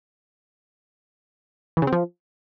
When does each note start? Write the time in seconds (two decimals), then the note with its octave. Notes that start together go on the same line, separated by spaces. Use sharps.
1.77 E3
1.82 C#3
1.87 C4
1.92 F3